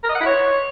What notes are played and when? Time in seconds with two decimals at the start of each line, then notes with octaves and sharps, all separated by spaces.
0.04 A#4
0.10 D#5
0.15 F#5
0.21 E4
0.26 C#5